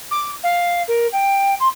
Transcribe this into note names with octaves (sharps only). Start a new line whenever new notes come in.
D6
F5
A#4
G5
C6